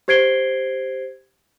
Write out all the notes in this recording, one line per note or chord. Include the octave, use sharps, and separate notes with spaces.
G4 C5 G#6 C7 D7 G7